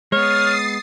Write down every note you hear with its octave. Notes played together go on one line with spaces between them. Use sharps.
G#3 B3 C#5 D#6 F6 A6 C7